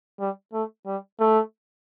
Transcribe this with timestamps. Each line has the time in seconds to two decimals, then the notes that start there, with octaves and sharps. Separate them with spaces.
0.20 G3
0.53 A3
0.86 G3
1.20 A3